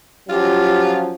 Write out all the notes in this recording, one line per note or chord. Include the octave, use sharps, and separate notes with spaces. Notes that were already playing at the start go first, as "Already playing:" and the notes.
F3 F#3 C#4 F4 G4